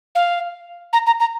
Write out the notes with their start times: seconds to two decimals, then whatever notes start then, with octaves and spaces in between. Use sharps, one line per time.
0.15 F5
0.93 A#5
1.06 A#5
1.20 A#5